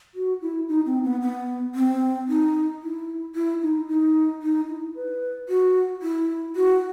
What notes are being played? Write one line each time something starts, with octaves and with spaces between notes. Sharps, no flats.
F#4
E4
D#4
C4
B3
B3
C4
D#4
E4
E4
D#4
D#4
D#4
E4
B4
F#4
E4
F#4